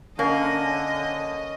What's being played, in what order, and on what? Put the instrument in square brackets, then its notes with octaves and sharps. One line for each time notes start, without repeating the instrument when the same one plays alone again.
[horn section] D3 [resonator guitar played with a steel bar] A#3 [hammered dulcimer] C#4 [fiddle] D#5